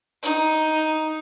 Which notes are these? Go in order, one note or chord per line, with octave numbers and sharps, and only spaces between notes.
D#4